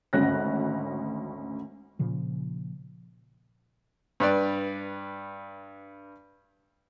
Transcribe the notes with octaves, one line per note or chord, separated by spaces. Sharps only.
G#1 D2 C#4 F#6 A#6
A#2 C#3 F3
G2 B4 D5